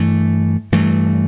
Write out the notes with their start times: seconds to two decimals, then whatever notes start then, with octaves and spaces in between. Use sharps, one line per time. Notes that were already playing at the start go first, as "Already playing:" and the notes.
Already playing: G2 E3 A3
0.72 G2 E3 A3